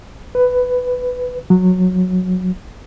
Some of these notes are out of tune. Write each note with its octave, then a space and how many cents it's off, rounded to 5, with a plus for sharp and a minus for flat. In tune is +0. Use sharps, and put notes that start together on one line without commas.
B4 +10
F#3 -15